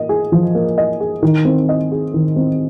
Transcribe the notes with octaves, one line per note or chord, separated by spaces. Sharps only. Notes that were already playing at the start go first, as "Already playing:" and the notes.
Already playing: A#3 D#5
G#4
F3
A#3
D#5
G#4
D#3
C4
D#5
G#4
D#3
C4